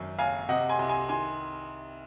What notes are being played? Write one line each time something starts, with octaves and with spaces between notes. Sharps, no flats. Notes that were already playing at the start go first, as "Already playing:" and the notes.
Already playing: G#1 F#2
F#1 F5 G#5
C3 D#5 F#5
G#5 C6
C2
G#5 C6
D#3 G#5 C6